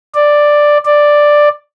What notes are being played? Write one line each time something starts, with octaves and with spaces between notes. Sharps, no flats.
D5
D5